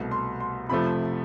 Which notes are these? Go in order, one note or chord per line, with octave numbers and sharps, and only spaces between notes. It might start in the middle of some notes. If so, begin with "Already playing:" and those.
Already playing: C2 B2 A3
C6
C6
F2 C3 F3 A3 B5